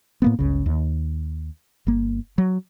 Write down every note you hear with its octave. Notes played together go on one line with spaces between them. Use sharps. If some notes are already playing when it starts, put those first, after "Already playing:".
A2 A#3 B3
G1 C#2 C#3
D#2
G1 A#3
F#3